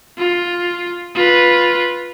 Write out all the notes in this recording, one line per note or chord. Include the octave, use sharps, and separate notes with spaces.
F4
F4 B4